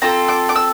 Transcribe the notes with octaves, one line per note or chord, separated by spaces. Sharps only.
C4 F4 A4 A#5
D6
D6
E6